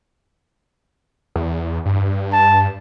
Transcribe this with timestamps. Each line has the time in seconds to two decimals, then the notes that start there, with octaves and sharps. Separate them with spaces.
1.36 E2
1.86 G2
2.33 A5